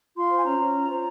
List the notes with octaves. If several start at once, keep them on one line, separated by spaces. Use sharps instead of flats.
F4 C6
C5
G#5
C#4 A#5
C#4
F4
C5